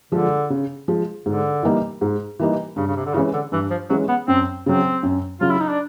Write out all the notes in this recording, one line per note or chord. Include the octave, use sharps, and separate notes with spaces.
D3 F3 G#3
C#3
F3 G#3
G#2 D3
E3 G3 A#3 D#4
G#2
E3 G3 A#3 D#4
G2 C#3
C#3
C3
D3
C#3 E3 G#3 C#4
D3
G2 E3
F3
E3 F#3 G#3 C#4
B3
F#2 C4
C#3 F#3 C4
F#2
C#3 F#3 F4
E4
D#4
D4